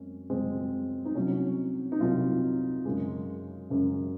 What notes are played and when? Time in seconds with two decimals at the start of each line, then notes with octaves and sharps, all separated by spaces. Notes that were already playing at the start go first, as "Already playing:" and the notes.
Already playing: F#2 G#3 C4 C#4
0.30 F#2 C#3 G#3 C4
1.05 D#4
1.15 C2 C3 F#3 C#4
1.92 D#4
2.00 C2 C3 F#3 F4
2.85 F#2 C#3 G#3
3.70 F#2 C#3 G#3